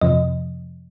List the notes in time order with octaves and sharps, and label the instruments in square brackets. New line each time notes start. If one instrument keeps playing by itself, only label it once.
[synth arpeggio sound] F2 C3 F3 D#5